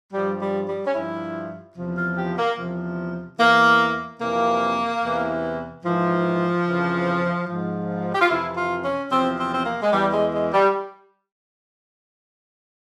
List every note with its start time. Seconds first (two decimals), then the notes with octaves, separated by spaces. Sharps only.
0.13 G2 F3 G3
0.40 G3
0.67 G3
0.86 C#4
0.94 G2 F3 E4
1.76 E2 C3 F3
1.96 F4
2.17 G4
2.37 A#3
2.58 E2 C3 F3
3.39 E2 E3 A#3
4.20 F2 C3 E3 A#3
5.02 E2 C3 E3
5.84 G#2 E3 F3
6.66 F2 C#3 E3
7.47 G#2 F3
8.14 G4
8.21 F4
8.29 F2 C3 E3 E4
8.56 F4
8.83 C#4
9.10 E2 C3 F3 C4
9.37 C4
9.53 C4
9.65 A#3
9.82 G#3
9.92 E2 E3 G3
10.12 G#3
10.33 G#3
10.53 G3